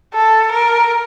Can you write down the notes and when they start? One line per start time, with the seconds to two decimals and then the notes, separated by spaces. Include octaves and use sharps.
0.14 A4
0.52 A#4